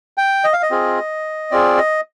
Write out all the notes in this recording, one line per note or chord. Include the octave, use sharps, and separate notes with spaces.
G5
D#5
F5
D#5
C4 F4 G#4
C4 F4 G#4 D5
D#5